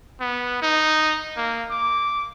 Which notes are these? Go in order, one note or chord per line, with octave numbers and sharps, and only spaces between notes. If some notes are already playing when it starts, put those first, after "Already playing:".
B3
D#4
A#3
D6